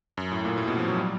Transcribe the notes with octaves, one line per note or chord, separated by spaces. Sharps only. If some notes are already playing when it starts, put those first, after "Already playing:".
F#2
A2
A#2
A2
B2
F3
F#3
G3